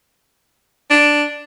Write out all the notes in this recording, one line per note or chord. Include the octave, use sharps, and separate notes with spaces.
D4